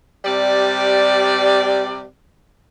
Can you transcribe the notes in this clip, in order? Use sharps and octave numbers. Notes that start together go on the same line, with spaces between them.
C3 G3 D5